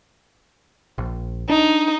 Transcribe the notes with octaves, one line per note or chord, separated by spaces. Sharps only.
A#1
D4 D#4